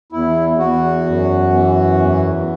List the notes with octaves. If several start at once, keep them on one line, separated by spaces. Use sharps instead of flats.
E2 E4
E2 F#4
F#2
E3
E2